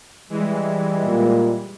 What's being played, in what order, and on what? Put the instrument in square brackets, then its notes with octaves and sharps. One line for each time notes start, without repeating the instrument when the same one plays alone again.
[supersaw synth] E3 G#3 [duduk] G3
[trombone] A#2